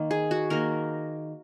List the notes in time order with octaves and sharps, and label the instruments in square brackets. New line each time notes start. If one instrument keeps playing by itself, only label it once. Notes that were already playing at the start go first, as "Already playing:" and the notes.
Already playing: [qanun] D#3 A#3
G#4
F#4
D#3 A#3 A#4